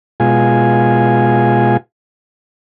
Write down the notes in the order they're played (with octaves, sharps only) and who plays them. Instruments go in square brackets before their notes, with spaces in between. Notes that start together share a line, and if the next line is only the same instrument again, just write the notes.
[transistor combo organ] B2 G#3 F4 G#5